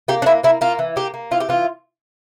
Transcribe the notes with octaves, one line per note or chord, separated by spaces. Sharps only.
A#3 G4
D4
A#3 E4
A#3 E4
A#3 F4
E3
A#3 G4
A#3
E3 F4
G4
E3 F4